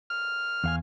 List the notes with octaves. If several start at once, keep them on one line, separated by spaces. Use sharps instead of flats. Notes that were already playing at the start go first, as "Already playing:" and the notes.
F6
E2 F5 G#5